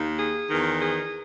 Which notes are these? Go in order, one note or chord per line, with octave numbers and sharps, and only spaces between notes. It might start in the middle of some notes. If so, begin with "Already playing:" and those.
Already playing: D#2 D#3
G#4
E2 D#3
G#4